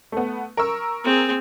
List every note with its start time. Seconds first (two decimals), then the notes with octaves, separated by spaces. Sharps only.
0.12 A3 B3
0.57 A#4 C#6 E6
1.05 C4 G#4